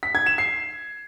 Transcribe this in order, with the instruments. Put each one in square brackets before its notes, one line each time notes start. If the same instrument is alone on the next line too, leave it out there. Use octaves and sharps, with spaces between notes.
[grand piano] B6
G#6
E7
C7